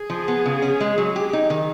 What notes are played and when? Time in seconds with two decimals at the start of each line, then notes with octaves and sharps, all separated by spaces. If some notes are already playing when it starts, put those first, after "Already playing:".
Already playing: G#4
0.10 F3
0.28 B3
0.46 C#3
0.62 C#4
0.81 G#3
0.98 F#3
1.16 G4
1.33 D#4
1.50 D#3